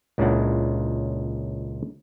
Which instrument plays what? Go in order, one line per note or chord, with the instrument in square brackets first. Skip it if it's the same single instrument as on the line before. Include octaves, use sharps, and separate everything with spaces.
[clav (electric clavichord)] C#2 A#2 C#3 D4 E4 F#5